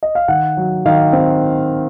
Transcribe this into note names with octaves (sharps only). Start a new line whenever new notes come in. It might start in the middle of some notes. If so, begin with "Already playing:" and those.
D#5
F5
D#3 F#5
F#3
D#3 F5
C4